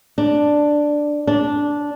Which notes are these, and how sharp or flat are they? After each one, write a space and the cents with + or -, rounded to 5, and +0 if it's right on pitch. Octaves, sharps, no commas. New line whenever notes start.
D4 +5
D4 -10